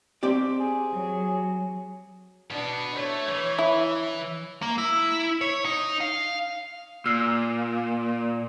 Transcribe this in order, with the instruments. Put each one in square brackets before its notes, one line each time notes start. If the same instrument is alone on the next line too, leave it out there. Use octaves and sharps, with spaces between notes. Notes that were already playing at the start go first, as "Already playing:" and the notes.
[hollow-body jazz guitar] C4 G4 D5
[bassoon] G#4
[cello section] F#3
[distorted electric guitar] B2 B3 [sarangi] D4
[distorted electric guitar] A3 [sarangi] C#5
[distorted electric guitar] E3
[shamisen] E4
[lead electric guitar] A#3
E4
C#5
D#4
F5
[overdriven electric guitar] A#2 [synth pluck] E6 F6 C7